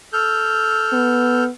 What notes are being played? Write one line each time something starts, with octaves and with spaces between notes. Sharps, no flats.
A4 F6 G6
B3